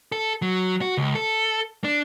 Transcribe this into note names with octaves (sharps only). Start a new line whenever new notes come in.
A4
F#3
F#4
C#2
A4
D4